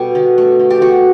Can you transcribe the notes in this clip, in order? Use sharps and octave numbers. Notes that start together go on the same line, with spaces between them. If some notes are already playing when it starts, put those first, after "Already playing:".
Already playing: B2 G3 B3 G4 A4
D3
A3
D3
G4
D3 F#4